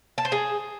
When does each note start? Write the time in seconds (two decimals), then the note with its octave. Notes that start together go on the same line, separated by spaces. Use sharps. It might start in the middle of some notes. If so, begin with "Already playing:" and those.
0.18 A5
0.25 C5
0.32 G#4